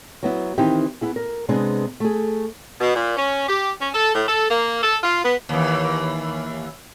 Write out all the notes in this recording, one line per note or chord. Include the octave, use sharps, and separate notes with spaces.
F#3 B3 E4
D#3 E3 C4 D#4 E4 G4
B3 E4 G#4
A#4
C3 G#3 B3 D4 G#4
A3 G#4
B2
A#2
C#4
G4
C#4
A4
A2
A4
A#3
A4
F4
B3
D#2 E3